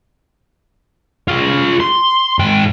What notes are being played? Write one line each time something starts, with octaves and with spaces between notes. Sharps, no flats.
F4 G#4
C6
G#2 G5